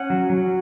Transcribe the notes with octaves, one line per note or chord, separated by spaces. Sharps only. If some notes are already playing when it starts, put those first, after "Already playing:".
Already playing: C#4 F#5
F#3
F#3